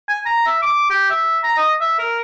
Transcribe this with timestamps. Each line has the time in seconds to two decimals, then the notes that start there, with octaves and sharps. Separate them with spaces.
0.08 G#5
0.26 A#5
0.46 E5
0.62 D6
0.90 G4
1.10 E5
1.44 A#5
1.57 D#5
1.81 E5
1.99 A#4